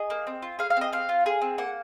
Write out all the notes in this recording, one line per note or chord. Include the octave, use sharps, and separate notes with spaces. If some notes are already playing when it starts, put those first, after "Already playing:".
Already playing: G#4 D#5
A#3
C4
F4
G#4 F5
F5
C4 D#5
C4 F5
F4
G#4
C4
A#3 F#5